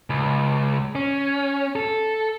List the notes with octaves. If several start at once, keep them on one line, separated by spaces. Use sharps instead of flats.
C#2
C#4
A4